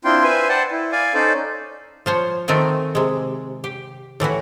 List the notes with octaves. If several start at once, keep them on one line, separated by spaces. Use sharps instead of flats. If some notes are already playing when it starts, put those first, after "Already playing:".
C4 D4 E4 F4 G5 C6
B4 C5 E5 G#5
C5 D5 F#5 G5 A5
E4
D5 F5 G#5
C#4 D#4 A4 C5 D5
F3 C5 C#5
D#3 A3 C4 G#5
C3 G#3
G4
A2 E3 E4 F#4